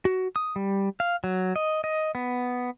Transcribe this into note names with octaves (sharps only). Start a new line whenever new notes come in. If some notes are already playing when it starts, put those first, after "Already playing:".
F#4
D#6
G3
F5
F#3
D#5
D#5
B3